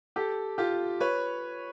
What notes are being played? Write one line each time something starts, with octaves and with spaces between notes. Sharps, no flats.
G4 A4
F4 G4
B4 C#5